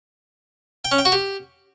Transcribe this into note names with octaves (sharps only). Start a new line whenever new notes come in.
G5
C#4
G5
F#4
G4